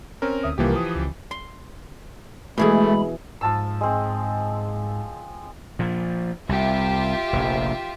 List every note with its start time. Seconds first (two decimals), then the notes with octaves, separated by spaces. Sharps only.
0.22 C4 C#4 A#4
0.43 D2 E5 D#6
0.58 C2 C3 E3 F3 A#3 G4
0.76 D#6
0.95 C#2
1.31 C6
2.58 B2 E3 G#3 A3 G#4 B5
3.41 G#2 F3 A5 E6
3.81 G#3 C4
5.79 A#2 F3
6.49 C2 F4 G4 E5
7.33 F1 A#1